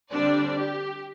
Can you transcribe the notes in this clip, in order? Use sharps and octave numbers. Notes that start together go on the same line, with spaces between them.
D3 G3 C4 D4 D5
G4